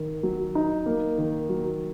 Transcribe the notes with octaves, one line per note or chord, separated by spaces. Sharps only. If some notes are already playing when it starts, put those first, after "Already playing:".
Already playing: D#3
F#3
D#4
A#3
D#3
F#3